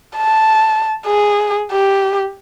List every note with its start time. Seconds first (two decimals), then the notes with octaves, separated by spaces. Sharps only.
0.17 A5
1.06 G#4
1.72 G4